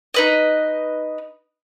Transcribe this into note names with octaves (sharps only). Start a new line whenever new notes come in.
D#4 B4 D#5